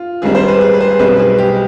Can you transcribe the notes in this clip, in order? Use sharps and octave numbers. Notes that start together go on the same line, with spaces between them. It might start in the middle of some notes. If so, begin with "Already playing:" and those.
Already playing: F4
G#1 G#2 G3 C4 G#4
C5
B4
G#4
B4
C5
G#4
B1 B2 G3 C4 B4
B4
G#4
G4